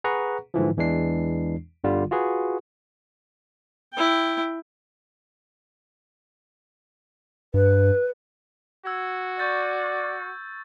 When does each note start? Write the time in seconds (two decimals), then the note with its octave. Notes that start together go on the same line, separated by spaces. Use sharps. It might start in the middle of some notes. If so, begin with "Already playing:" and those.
0.04 G#4 B4 F#5 A#5 C#6
0.54 G#2 D3 E3 F3
0.77 E2 E3 G#3 D4 C7
1.84 G1 D3 G3 F4
2.11 F4 F#4 G#4 B4
3.94 E4 G5
7.54 G2 B4
8.86 F#4 E6 G#6
9.39 D5 C#6 G6 A6